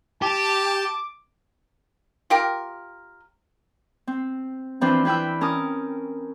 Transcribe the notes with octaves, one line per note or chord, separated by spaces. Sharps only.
G4 A5 D6
F4 G4 A#4
C4
E3 F3 C4 D4 B4 C5
C4 E4 B4 G5 E6
C#4 A#4 A5 D#6